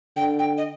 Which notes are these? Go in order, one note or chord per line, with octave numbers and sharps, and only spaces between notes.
D3 G5
G5
D#5